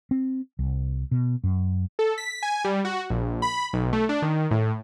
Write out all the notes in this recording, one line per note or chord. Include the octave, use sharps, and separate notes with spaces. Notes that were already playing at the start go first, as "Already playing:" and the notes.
C4
C2
B2
F#2
A4
B6
G#5
G3
F#4
A#1
B5
B1
A3
D4
D#3
A2